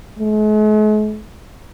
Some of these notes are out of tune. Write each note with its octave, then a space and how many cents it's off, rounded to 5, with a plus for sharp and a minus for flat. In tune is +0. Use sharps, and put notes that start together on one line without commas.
G#3 +45